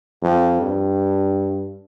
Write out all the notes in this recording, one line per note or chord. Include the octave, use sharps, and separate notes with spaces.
F2
G2